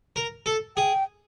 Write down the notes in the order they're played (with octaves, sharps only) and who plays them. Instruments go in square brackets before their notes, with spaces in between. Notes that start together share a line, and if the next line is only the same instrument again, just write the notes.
[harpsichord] A#4
A4
[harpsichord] G#4 [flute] G5